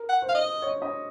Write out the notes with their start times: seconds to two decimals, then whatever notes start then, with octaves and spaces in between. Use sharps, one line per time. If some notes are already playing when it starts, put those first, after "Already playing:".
Already playing: A#4
0.09 F#5
0.22 C5
0.29 F5
0.35 D#5
0.62 C#5
0.82 D#5